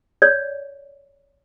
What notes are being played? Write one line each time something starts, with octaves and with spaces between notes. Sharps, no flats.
C#5 D5